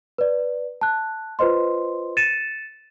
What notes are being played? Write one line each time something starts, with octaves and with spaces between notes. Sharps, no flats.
B4 D5
A5 F#6
F4 B4 C5 D#5 C6
A6 C#7 D#7 E7